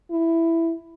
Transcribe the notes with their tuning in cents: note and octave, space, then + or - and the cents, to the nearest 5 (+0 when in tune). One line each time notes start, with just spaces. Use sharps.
E4 +5